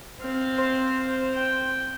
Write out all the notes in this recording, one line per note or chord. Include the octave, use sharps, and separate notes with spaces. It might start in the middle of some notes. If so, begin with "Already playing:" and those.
C4 F5
C5
G5